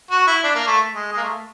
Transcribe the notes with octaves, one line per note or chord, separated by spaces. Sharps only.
F#4
E4
D4
A#3
A3
G#3
G#3
A#3
A3